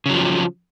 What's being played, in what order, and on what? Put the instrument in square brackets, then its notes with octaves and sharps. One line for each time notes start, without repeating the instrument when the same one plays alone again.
[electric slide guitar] C#3
F#3
F3